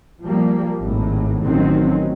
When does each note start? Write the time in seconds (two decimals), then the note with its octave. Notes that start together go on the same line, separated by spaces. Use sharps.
0.23 F3 G3 A#3
0.78 G#1 A2
1.42 A1 D#3 F#3 C4 C#4